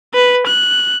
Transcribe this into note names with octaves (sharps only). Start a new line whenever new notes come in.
B4
F#6